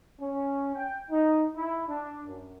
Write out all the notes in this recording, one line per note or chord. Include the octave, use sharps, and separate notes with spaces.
C#4
G5
D#4
E4
D4
F#2